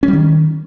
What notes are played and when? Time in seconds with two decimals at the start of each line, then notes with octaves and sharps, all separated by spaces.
0.03 C#4
0.08 G3
0.13 D#3